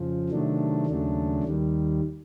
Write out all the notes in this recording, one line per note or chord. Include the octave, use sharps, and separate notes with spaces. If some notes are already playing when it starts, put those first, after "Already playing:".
Already playing: F2 C#3 F3
C3 D#3 F#3 A3 D4
D#2 C#3 F#3 A3 D4
D#2 D#3 G3